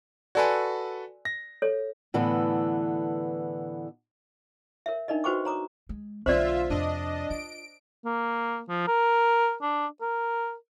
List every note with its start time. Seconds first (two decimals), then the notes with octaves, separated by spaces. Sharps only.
0.35 F#4 A4 B4 D5 G#5 C6
1.25 A#6
1.62 A4 C#5
2.14 A2 D3 E3 B3 A4
4.86 A#4 C#5 E5
5.08 D4 D#4 A#4 D5 D#5
5.24 F#4 B4 C5 G5 C#6 D6
5.45 C#5 A#5 D6 D#6
5.89 G#3
6.26 B1 D3 F4 C5 D5 E5
6.70 F2 C3 D4 D#5
7.30 F4 D7
8.05 A#3
8.69 F3
8.87 A#4
9.62 D4
10.01 A#4